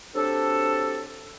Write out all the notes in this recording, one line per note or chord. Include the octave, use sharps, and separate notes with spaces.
F#3 C4 D4 G4 A4